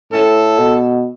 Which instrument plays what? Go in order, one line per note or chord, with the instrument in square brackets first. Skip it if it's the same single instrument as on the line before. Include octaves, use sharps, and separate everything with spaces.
[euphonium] A2 [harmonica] C#4 A4
[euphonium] B2